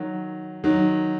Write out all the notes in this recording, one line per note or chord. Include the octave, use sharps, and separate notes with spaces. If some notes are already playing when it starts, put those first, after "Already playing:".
Already playing: D#3 F#3
D#3 F#3